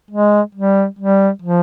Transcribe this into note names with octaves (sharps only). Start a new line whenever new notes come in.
G#3
G3
G3
F3